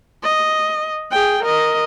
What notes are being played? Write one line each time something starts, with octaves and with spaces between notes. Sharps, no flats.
D#5
G#4 G5
A#4 D#5